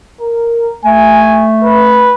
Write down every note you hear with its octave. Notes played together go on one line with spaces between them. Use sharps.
A#4
A3 G#5
B4